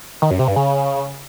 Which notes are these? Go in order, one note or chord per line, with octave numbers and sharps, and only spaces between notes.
D#3
F#2
C3
G2
C#3